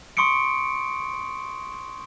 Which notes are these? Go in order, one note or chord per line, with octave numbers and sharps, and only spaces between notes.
C6 C#6 D#6 C#7 D7